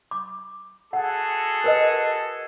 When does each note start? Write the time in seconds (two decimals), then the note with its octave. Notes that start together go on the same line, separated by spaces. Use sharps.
0.11 D6
0.93 F#4 G#4 A4 F#5
1.64 A#4 B4 D#5